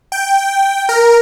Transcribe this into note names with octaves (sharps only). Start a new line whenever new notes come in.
G5
A#4